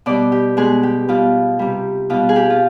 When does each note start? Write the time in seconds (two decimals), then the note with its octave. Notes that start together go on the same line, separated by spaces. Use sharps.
0.06 B2 G3 D5
0.32 G4
0.57 B2 G#3 G#4
0.83 G4
1.08 B2 G3 F4
1.59 C3 G3
2.10 B2 G3 F4
2.29 G#4
2.36 G4
2.50 F4